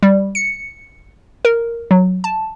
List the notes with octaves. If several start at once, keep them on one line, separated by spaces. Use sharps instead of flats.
G3
C#7
A#4
F#3
A5